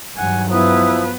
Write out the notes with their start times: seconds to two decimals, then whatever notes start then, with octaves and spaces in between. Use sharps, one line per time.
0.17 G2 D#3 F#3 F#5 G#5
0.50 F3 B3 E4 B4 D#6